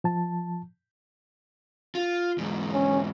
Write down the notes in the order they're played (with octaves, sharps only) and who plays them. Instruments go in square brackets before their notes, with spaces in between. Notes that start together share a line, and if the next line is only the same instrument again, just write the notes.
[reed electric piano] F3 A5
[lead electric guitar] F4
E2 G#2
[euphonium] C#4